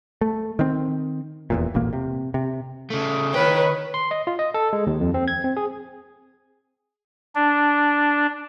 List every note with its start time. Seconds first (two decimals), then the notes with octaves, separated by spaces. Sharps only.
0.21 A3
0.59 D#3 C4
1.50 D#1 E2 A#2
1.74 E1 A1 A#2 A#3
1.93 C3
2.34 C3
2.90 C#3 A3
3.34 D#3 B4 C#5 G5
3.94 C6
4.11 D#5
4.27 F4
4.39 D#5
4.54 A4
4.73 G#3
4.87 D#2
5.00 F2
5.14 C4
5.28 G#6
5.44 C4
5.57 G#4
7.35 D4